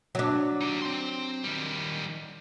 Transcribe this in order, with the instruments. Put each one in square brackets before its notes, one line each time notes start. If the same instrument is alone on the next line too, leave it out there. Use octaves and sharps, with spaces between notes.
[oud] F#3 D4
[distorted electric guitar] D#4 G4
C4 C6
D#3 G3